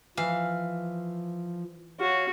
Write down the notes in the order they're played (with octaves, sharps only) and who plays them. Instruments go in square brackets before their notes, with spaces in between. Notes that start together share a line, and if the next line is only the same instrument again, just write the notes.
[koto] E3 [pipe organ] F3 [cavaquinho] F5
[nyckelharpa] F#4 [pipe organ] C#5 F5